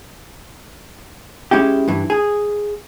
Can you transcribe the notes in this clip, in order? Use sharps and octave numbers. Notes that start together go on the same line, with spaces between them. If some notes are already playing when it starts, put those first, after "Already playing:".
G#3 C#4 E4 G4
G2 E3
G#4